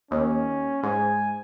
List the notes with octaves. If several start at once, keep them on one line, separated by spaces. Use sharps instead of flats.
D#2 C#4
G#2 G#5